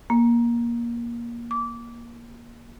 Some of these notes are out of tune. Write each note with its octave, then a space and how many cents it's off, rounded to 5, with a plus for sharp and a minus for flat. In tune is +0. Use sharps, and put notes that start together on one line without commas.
A#3 +20
D6 -20